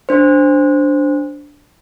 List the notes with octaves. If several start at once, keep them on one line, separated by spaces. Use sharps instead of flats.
D4 C5